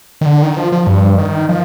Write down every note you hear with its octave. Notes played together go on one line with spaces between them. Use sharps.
D#3
D3
D#3
F3
F3
G2
D#3
F3